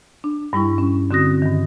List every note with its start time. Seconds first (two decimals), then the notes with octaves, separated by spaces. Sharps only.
0.24 D4
0.53 G2 G3 E4 C#6
0.78 C#4
1.11 D3 C4 F#4 D#6 A#6
1.42 G2 D#3